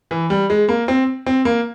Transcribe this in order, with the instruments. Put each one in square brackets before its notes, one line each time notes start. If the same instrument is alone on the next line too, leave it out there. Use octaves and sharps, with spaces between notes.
[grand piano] E3
G3
G#3
A#3
C4
C4
A#3